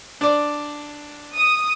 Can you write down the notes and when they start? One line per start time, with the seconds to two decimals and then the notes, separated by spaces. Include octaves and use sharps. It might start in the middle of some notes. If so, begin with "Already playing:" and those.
0.21 D4 D5
1.36 D#6